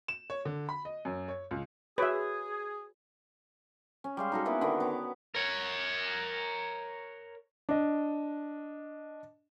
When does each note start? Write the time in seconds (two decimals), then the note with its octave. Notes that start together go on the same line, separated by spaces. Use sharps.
0.08 E7
0.30 C#5
0.45 D3
0.69 B5
0.85 D#5
1.05 F#2
1.28 C#5
1.51 C#2
1.98 F#4 G#4 B4 C#5 E5
4.04 C#4
4.17 G3 G#3 F5
4.32 D#4 F#4 A4
4.45 A#3 B3 E4 B4
4.61 D3 D#3 B3
4.80 B3 C#5 D6
5.35 A#4 C#5
7.69 D4 D#5